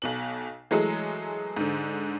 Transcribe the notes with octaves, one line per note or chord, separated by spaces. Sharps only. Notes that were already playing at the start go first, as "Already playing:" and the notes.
B1 B2 F#7
E3 F#3 G#3 A3 G#4
G#2 D3